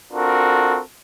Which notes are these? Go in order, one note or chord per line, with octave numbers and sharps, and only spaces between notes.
C4 D4 F4 F#4 A4 A#4